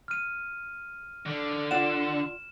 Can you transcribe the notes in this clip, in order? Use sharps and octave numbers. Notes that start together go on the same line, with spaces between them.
F6 D#7
D3
F4 D5 F#5 E7